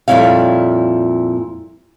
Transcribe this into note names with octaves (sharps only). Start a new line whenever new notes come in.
F2 A#2 G3 E4 C#5 F5